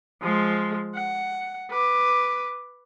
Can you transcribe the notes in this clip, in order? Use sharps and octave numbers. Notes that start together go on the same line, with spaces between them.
F3 G#3
F#5
B4 D6